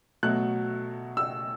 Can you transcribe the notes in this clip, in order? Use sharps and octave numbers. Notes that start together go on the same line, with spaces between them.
B2 F#3 A3 F#6
E6